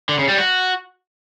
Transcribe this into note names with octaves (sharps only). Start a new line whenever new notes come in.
D3
C#3
G3
F#4